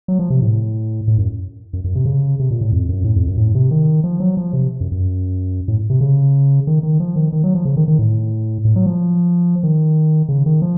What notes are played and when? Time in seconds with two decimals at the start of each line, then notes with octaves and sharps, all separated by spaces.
0.08 F#3
0.19 F3
0.30 C3
0.42 A2
1.08 A2
1.18 F#2
1.73 F#2
1.84 F#2
1.95 C3
2.06 C#3
2.39 C3
2.51 A#2
2.61 A2
2.72 F2
2.89 F#2
3.04 A2
3.16 F2
3.27 F#2
3.38 A2
3.55 C3
3.71 D#3
4.04 F3
4.20 F#3
4.37 F3
4.53 C3
4.80 F#2
4.92 F#2
5.68 A2
5.90 C3
6.01 C#3
6.67 D#3
6.83 D#3
7.00 F3
7.16 D#3
7.33 D#3
7.44 F#3
7.55 F3
7.65 C#3
7.77 D#3
7.88 D#3
7.99 A2
8.65 A2
8.76 F#3
8.86 F3
9.63 D#3
10.29 C#3
10.46 D#3
10.62 F3